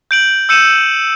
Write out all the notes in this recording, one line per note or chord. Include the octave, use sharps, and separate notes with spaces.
G6 D7 F#7
E6 G6 C#7 D#7 E7